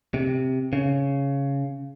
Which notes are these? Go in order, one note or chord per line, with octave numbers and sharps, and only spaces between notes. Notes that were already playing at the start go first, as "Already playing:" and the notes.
C3
C#3